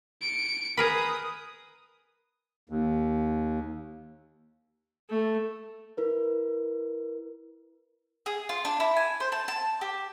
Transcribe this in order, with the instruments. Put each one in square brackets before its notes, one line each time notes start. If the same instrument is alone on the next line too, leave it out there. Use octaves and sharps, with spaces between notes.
[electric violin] C#7 D7
[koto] G#4 A#4 B4 [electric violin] D#6
[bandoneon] D#2
[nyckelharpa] A3
[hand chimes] E4 A#4 B4
[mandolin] G#4
F4
D4
E4
G#5
C5
A5
A5
G4